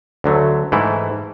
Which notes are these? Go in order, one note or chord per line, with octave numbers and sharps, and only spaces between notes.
D2 D3 F#3 A3
G#2 E3 A3 E4